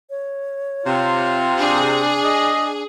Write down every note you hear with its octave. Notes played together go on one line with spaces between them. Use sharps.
C#5
C3 F4
D4 G#4
D#5